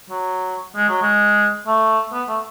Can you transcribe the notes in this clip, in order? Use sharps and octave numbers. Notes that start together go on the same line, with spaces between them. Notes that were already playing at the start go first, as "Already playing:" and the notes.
F#3
G#3
F#3
G#3
A3
B3
A3